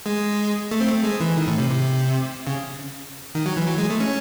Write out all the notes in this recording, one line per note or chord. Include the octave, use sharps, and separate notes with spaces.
G#3
A3
C4
A3
G#3
E3
D#3
A2
C3
C3
C#3
D#3
F#3
E3
F#3
G#3
A3
C#4